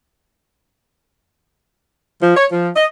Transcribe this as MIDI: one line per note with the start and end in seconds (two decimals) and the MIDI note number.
2.21 2.35 53
2.36 2.45 73
2.51 2.69 53
2.76 2.85 75